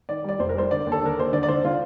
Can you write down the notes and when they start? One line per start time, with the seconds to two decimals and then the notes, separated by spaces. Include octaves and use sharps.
0.09 D#3 D5
0.24 G3 D5
0.39 F1 C5
0.49 A#4
0.55 G3 C5
0.71 D3 D5
0.87 D#2
0.92 A4
1.02 D3 A#4
1.18 D#2 C5
1.32 D3 D5
1.43 D5
1.48 D3 C5
1.64 D3 F4